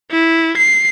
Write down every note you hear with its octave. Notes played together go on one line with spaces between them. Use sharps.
E4
C7